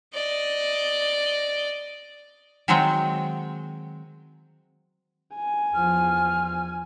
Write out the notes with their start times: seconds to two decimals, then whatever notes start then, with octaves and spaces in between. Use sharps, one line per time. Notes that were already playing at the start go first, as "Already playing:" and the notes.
0.14 D5 D#5
2.68 D#3 F#3 G#3 C4 F#5 G5
5.35 G#5
5.75 E2 F3 F6